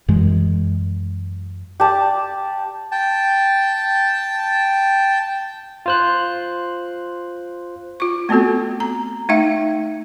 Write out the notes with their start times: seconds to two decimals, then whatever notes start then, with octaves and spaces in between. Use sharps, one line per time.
0.08 F#2 E3 G#3
1.80 G4 D5 A5
2.92 G5 A5
5.86 F4 C5 F#6
8.00 F4 C#6
8.29 A3 B3 C4 F#4 A4
8.80 A#5
9.29 A3 D#4 E5 F5